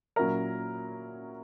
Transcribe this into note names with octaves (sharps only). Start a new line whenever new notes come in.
A#2 F#3 C#4 E4 A#4